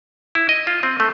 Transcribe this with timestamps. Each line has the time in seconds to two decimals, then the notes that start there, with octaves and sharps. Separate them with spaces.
0.35 E4
0.49 D#5
0.67 F4
0.83 C4
1.00 A3